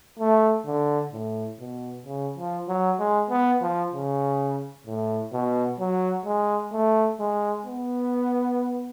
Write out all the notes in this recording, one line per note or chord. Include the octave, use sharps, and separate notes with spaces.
A3
D3
A2
B2
C#3
F3
F#3
G#3
B3
F3
C#3
A2
B2
F#3
G#3
A3
G#3
B3